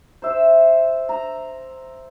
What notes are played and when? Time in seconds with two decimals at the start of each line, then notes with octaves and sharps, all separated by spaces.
0.22 C5 E5
1.09 A#5